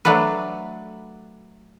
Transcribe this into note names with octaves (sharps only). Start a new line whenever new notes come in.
F#3 A3 D4 F#4 B4